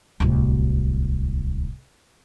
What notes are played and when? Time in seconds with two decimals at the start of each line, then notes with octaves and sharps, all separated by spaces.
0.20 D1 C2